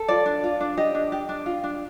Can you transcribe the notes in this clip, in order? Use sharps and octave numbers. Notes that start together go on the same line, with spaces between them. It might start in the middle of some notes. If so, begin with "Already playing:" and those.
Already playing: A4
F4 D5
D4
F4
D4
G4 D#5
D4
G4
D4
F4
D4